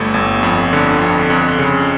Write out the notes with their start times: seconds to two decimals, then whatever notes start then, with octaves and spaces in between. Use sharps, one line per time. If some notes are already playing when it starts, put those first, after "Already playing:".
Already playing: G1 G2 A3
0.14 G1
0.43 F2
0.73 D3
1.01 F2
1.30 F2
1.59 C#3